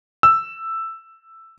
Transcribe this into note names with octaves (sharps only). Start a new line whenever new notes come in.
E6